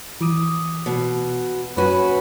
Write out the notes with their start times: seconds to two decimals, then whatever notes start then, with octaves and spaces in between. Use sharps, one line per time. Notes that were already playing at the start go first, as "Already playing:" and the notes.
0.21 E3 D6 D#6
0.86 B2
1.77 F#2 C#4 F#4 B4 D#7